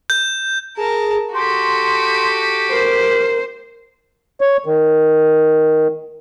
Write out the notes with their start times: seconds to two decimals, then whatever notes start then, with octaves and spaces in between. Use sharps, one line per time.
0.10 G6
0.77 G#4 A#4 A5
1.34 F#4 G4 A4 C6
2.72 A#4 C5
4.41 C#5
4.66 D#3